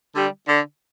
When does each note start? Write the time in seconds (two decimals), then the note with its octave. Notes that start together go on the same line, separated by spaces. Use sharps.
0.15 D3 G3
0.47 D3